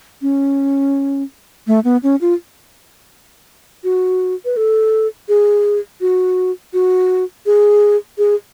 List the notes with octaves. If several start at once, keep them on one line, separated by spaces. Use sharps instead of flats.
C#4
A3
B3
C#4
F4
F#4
B4
A4
G#4
F#4
F#4
G#4
G#4